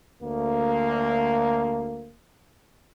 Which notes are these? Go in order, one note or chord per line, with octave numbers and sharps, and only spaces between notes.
D2 A#3